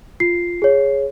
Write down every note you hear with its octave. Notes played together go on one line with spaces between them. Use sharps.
F4 C7
G#4 C#5